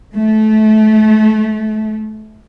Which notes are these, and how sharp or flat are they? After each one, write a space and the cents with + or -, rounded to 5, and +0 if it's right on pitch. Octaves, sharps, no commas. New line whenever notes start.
A3 -25